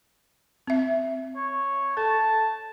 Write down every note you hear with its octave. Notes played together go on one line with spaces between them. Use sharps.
C4 E5
C#5
A4 A5